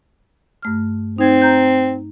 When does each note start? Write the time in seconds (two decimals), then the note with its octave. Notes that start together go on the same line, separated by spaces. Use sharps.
0.62 G2 A3 F6
1.18 C4 D#4 G#6
1.42 A#5 G6